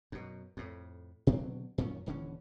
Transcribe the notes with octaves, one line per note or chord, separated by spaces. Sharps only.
F#2 B2
F2 A2
B2 D3 F#3 C4
F#2 A#2 D#3 C#4
D#1 D3 E3 C#4